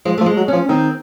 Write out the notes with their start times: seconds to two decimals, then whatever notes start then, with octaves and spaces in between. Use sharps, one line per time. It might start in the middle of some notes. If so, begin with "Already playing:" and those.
0.05 F3 G#3
0.18 A3
0.21 F3
0.26 G#3
0.37 F#3
0.48 F3 C#4
0.69 D#3 C4